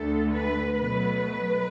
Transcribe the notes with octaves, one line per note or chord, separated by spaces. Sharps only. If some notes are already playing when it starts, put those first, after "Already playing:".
Already playing: D2 D3 A3 A4
B4
B2 F#3 A3 B4